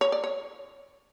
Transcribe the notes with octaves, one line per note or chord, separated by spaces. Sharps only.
C#5
D5
C#5